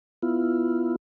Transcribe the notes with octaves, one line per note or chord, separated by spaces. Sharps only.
B3 E4 F4